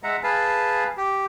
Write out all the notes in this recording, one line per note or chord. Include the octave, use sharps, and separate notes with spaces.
G#3 E5 F#5 A#5
G#4 B4 F5 A5
G4